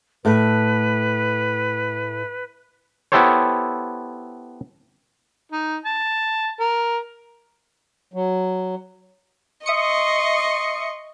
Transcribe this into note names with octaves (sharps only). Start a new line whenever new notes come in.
A2 A3 B4
B3 E4 G4 A4 C5 C#5
D#4
A5
A#4
F#3
D#5 E5 C6 C#6 D#6 C#7